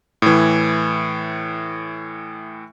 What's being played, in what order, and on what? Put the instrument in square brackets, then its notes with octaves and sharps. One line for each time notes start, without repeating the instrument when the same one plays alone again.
[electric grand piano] A2 E3